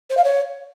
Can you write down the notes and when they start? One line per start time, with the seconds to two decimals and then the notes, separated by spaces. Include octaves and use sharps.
0.10 C5
0.17 F5
0.24 C#5